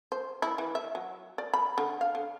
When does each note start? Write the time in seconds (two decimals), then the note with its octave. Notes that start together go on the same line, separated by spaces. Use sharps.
0.12 C5
0.42 E4
0.58 E3
0.75 E5
0.95 F#3
1.38 D5
1.54 B5
1.78 D3
2.01 F5
2.15 D3